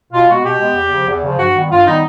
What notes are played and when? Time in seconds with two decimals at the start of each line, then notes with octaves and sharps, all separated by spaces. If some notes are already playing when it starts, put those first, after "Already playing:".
0.12 B2 F4
0.28 G#3 B3 F#4
0.45 B2 G4
0.60 G#3 B3
0.75 E2
0.91 C#3 F3
1.08 E2
1.23 C#3 F3
1.39 G2 F#4
1.54 D#3 G3 B3
1.70 G2 F4
1.86 D#3 G3 B3 D#4